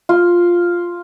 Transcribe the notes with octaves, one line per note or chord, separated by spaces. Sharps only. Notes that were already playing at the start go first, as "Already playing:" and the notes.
F4